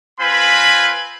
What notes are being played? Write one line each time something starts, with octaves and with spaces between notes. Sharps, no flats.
C4 F4 B4 G#5 B5